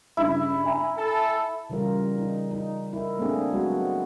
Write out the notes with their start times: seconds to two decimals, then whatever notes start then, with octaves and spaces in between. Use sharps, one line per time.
0.17 G2 C#3 E4
0.64 E5 G#5 A#5
0.97 A4
1.70 C#3 E3 G3 F4 A#4
2.18 D#4
2.51 D#4
2.93 E4 A#4
3.18 A3 A#3 C4 D4 G#4
3.53 F#3 G#3 B3 F#4